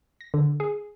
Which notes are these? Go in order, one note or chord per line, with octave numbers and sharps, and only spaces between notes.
A#6
D3
G#4